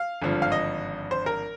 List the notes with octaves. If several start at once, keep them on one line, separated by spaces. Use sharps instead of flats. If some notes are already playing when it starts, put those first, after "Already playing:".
Already playing: F5
G#1 G2 D3 F3
F5
D#5
C5
A#4